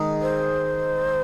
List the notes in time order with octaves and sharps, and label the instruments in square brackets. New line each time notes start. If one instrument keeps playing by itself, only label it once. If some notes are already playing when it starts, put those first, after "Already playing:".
Already playing: [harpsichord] D#3 G#3 G#4
[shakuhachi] C5